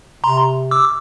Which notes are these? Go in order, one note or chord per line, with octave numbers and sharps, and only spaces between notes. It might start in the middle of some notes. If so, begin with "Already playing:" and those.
C3 A#5 C6
D6 E6